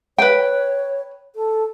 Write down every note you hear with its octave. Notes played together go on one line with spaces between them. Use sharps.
B4 C#5 G5
A4